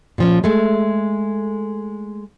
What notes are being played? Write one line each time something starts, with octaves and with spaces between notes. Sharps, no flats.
A#2 F3 C#4
G#3 A3